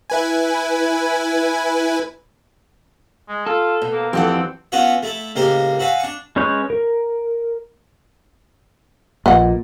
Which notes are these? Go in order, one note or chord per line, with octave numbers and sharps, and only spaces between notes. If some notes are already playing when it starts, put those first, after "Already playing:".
E4 B4 G#5
G#3
F4 A4
B2
A#3
F2 E3 C4 G4 A4 F#5
B3 C#4 F4 F#4 C#5 E5
A3 E4 A5
C#2 A2 A#3 G4 A#4 C5
F#4 E5 F5 G#5
D4 C#6
G#3 C#4 B4 C#5 G6
A#4
A#1 A#2 B4 D#5 F#5